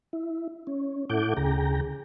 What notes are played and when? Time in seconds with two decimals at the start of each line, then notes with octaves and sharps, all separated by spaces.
0.13 E4
0.67 C#4
1.10 A2 E4 A4 F#5 D6 G6
1.37 D2 C#3 G#4 G5 A#5